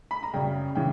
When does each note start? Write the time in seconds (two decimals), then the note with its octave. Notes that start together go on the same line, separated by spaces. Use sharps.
0.11 B5
0.23 A#5
0.33 F#2 C#3 G3 G5
0.75 C#3 E3 G5